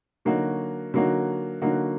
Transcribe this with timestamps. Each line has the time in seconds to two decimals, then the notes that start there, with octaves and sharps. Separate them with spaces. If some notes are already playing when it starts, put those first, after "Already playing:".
0.25 D3 F#3 A#3 D#4 F#4
0.94 D3 F#3 A#3 D#4 F#4
1.62 D3 F#3 A#3 D#4 F#4